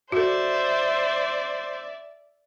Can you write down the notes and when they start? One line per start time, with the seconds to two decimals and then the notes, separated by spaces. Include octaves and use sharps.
0.12 F#4 A4 C5 D5 E5